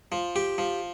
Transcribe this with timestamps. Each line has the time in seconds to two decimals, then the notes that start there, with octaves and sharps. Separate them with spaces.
0.12 F3
0.36 G4
0.58 F3